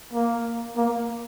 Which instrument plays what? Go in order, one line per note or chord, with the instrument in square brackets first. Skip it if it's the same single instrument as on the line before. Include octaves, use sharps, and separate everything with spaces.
[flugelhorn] A#3
A#3